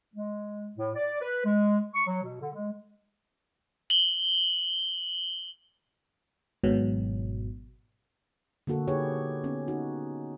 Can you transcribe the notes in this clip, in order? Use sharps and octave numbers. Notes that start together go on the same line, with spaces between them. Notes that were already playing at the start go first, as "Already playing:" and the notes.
G#3
A2
D5
B4
G#3
C#6
F#3
B2
D3
G#3
F#7 G7
G#1 G#2 B2 F#3
D3 A#3 F#4 A4
D#4 G4 G#4 B4 C#5
B3 C#4
D#4 F#4